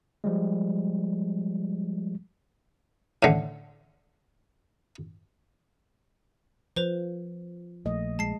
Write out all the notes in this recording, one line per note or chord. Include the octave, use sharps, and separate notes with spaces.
F3 G3 G#3
A2 D3
F3 B4 C5 F7
A#1 A3 D#5
G#3 A5 C7